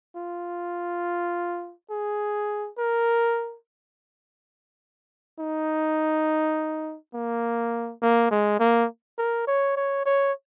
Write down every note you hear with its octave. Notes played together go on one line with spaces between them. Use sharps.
F4
G#4
A#4
D#4
A#3
A#3
G#3
A#3
A#4
C#5
C#5
C#5